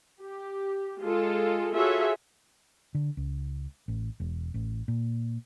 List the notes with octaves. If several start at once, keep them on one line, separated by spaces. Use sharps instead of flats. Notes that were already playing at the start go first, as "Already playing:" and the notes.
G4
G#3 F4 A4
F4 F#4 G#4 A4 C#5 E5
D3
C#2
A1
E1
A1
A#2